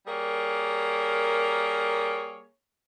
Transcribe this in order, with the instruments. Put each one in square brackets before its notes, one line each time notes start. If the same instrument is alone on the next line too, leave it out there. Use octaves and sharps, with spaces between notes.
[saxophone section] G3 A#3 G#4 A#4 C#5